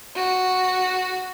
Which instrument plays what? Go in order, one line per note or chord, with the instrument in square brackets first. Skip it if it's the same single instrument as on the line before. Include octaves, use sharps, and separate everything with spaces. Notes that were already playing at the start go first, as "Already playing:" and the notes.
[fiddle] F#4